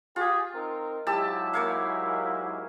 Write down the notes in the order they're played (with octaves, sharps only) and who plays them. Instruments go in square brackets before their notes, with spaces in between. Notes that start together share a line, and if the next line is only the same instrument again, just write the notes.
[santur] F4 [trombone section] G4 G#4
[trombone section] C4 D#4 A#4
[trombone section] G#2 F#3 E4 [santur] G4 A5 E6
[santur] A#3 C#5 F5